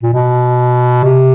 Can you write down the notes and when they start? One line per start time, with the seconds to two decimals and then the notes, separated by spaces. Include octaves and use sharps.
0.03 A#2
0.13 B2
1.04 C3